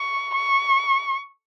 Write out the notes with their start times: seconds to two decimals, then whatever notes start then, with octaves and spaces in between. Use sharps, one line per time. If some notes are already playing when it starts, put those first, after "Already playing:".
Already playing: C#6
0.35 C#6